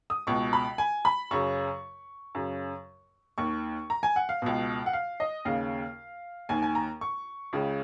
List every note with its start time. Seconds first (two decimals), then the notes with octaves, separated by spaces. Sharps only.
0.10 D#6
0.27 C#2 B2 C#6
0.53 B5
0.78 G#5
1.05 B5
1.31 F#2 C#3 C#6
2.35 F#2 C#3
3.38 D#2 D#3 C#6
3.90 A#5
4.03 G#5
4.16 F#5
4.29 F5
4.42 C#2 B2
4.86 F#5
4.93 F5
5.20 D#5
5.45 D#2 C#3 F5
6.49 D#2 D#3 G#5
6.62 G#5
6.75 A#5
7.01 C#6
7.53 C#2 C#3